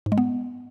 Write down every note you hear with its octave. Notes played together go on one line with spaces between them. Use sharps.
G#2
G#3
B3